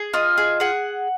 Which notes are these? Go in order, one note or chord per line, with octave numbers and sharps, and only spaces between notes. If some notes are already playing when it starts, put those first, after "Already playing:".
Already playing: G#4
F4 D#5
G#4
G#4 F#5